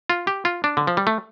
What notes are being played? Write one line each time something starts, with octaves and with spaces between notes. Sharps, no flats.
F4
G4
F4
D4
D3
F3
G3
A3